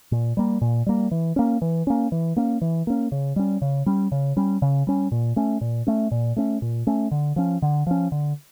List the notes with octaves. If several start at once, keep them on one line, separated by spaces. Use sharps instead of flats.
A#2
G3 A#3
A#2
G3 A#3
E3
A#3 C#4
E3
A#3 C#4
E3
A#3 C#4
E3
A#3 C#4
C#3
G3 C#4
C#3
G3 C#4
C#3
G3 C#4
C#3
G3 C#4
A#2
A3 C#4
A#2
A3 C#4
A#2
A3 C#4
A#2
A3 C#4
D3
F3 C#4
D3
F3 C#4
D3